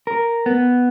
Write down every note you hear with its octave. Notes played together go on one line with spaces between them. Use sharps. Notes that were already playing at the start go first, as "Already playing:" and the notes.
A#4
B3